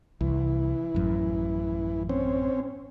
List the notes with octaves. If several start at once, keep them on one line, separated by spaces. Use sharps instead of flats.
C2 E3
A1 F#2 A2
C4 C#4